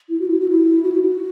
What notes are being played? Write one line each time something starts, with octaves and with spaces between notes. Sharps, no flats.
E4
F#4
E4
F#4
E4
F#4
E4
F#4